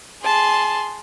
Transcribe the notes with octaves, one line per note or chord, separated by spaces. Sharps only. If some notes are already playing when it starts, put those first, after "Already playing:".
G#4 A5 C6